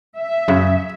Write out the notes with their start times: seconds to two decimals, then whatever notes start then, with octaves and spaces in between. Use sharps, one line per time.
0.17 E5
0.48 F#2 C#3